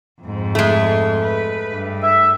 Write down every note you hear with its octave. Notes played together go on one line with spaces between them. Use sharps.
F2 G#2
G#3 A3
B4
G2
E5